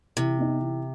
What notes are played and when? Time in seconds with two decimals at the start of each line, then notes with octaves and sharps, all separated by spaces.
0.17 C3 E3
0.38 B3 D#4
0.60 E3